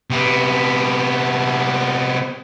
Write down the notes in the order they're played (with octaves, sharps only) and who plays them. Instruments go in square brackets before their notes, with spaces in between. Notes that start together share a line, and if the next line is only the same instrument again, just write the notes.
[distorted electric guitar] C3 B3